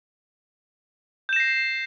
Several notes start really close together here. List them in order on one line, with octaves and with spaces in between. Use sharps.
G6 E7 A#6 C7